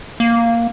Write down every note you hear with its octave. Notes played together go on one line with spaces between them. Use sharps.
A#3